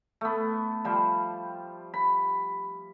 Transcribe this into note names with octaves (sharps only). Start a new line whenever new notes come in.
A3 B3
F3 G3 C5
B5